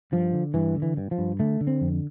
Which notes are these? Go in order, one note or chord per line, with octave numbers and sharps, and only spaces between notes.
G2 F3
D3
G2 E3
D3
E3
G2
F3
G2
D3 A3
D3
C4
F2